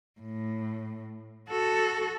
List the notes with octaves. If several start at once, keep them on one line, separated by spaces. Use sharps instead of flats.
A2
F#4 A4